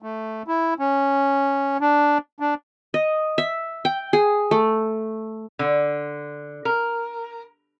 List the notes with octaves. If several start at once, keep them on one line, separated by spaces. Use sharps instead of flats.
A3
E4
C#4
D4
D4
D#5
E5
G5
G#4
A3
D3
A#4